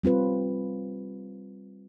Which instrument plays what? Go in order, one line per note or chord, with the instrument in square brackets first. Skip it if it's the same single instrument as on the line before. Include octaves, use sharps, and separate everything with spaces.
[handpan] G3 C4 F4 B4